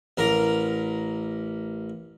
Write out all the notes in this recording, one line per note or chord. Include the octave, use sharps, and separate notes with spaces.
A1 A#4 A#5